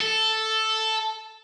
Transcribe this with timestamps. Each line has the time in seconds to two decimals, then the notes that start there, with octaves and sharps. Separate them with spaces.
0.01 A4